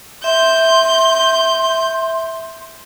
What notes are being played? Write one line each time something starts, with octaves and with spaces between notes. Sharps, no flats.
E5 C6 G6